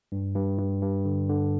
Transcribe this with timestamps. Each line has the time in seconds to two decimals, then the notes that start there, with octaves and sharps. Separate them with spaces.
0.12 G2
0.36 G2
0.59 G2
0.82 G2
1.05 D3
1.29 D3